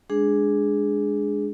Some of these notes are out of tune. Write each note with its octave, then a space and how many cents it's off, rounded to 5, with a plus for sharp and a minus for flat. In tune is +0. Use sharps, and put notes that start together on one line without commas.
G#3 +0 D4 +0 G#4 +0